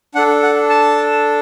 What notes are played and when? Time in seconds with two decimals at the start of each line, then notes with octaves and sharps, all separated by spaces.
0.15 D4 A4 F#5
0.43 F#5
0.70 A5